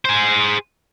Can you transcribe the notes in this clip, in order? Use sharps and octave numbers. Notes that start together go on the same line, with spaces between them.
G#4 C5